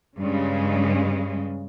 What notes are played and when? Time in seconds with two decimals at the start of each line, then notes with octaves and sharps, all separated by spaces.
0.19 G2 C#3 G#3